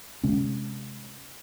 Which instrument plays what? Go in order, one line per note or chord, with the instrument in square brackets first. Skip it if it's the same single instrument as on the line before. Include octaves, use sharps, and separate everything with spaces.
[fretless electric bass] C3 G#3 C#4